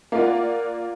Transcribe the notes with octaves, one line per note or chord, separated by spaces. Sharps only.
A#3 F4 D5 F#5